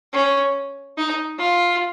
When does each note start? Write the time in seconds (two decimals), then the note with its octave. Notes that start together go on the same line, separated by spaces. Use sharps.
0.13 C#4
0.98 D#4
1.39 F4